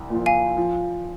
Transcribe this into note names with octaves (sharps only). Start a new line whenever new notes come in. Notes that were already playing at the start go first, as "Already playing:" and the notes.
Already playing: C2
A#2 F3
F5 G#5
F3